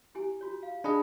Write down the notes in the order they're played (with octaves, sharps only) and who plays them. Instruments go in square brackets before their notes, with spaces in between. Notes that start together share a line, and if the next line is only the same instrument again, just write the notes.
[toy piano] E4 G4 G#5
F4 F#4 C#5
F5
[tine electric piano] D4 G#4 D#5 [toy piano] B5